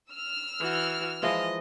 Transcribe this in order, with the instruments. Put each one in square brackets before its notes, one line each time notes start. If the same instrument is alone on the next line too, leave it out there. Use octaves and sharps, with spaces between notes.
[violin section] E6 F6
[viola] E3 F#4
[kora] E3 F3 G#3 [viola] D#5